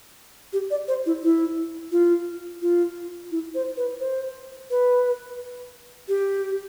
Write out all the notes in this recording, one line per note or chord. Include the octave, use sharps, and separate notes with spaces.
G4
D5
C5
E4
E4
F4
F4
E4
C5
B4
C5
B4
G4